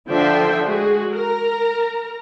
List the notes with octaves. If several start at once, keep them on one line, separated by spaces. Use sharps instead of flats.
D3 F3 D4 C5 E5 G5
G#3 F#4 G#4
A#4 A#5